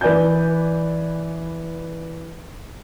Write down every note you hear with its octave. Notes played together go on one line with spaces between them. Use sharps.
E3 B4 D5 G#5 G6